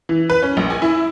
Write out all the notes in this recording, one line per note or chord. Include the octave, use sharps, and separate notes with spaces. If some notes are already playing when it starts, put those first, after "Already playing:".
E3
B4
C#4
A#1
G#5
E4